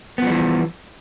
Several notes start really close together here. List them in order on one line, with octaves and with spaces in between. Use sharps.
B3 F3 G3 E3